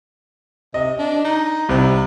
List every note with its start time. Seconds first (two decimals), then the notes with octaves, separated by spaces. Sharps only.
0.74 C3 D#5
0.99 D4
1.24 D#4
1.69 C2 C3